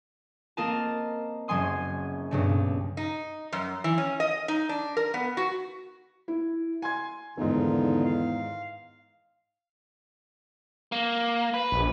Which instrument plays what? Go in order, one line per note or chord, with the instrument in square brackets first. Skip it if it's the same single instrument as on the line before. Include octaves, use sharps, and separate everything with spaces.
[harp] A#3 C4 F4 A#4 D#5 A5
F#1 F#3 G#5 C6 D#6
B1 G2 C#3
[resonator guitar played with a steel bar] D#4
F#2
E3
C#4
D#5
D#4
D4
A#4
B3
F#4
[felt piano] E4
G#5 C6 G#6
[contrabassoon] E2 [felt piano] G#2 D#3 [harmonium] D3 D#4 F4
[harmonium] F5
[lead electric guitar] A#3
B4
[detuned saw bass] A#1